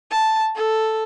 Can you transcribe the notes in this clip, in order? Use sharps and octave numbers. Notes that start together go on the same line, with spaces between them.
A5
A4